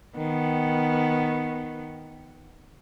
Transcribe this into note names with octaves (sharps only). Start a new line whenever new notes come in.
D#3 B3